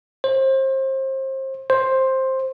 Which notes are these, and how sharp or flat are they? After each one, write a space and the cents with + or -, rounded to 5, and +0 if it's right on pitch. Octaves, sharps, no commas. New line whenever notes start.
C5 +30
C5 +10